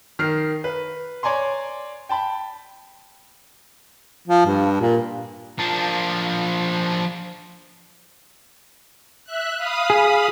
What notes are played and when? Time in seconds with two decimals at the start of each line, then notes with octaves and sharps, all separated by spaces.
0.19 D#3 F6 C7
0.64 B4
1.23 C#5 D5 G#5 A#5 C6
2.09 G5 A5 B5
4.28 F3
4.46 G2
4.80 A#2
5.59 F3 D4
9.25 E5 F#6
9.56 F5 B5 D#6
9.90 G#4